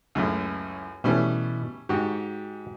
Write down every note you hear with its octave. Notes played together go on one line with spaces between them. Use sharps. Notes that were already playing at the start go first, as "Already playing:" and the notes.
C#2 F#2 A2
B2 E3 G3 A3 C#4
G#2 F#4 G4